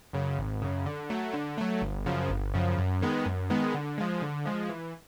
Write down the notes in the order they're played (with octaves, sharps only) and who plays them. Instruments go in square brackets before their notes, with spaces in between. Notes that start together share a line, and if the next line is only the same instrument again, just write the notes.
[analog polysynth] F#2 C#3
G#1
F#2 C#3
D3
F#3 A3
D3
F#3 A3
G1
F#2 C#3 F3
G1
F#2 C#3 F3
F#2
D#3 G#3 B3
F#2
D#3 G#3 B3
D3
F3 G#3
D3
F3 G#3
E3